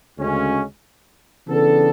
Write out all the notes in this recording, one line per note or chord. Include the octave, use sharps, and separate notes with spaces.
D2 C#3 G#3 C#4
C#3 E3 B3 D4 A4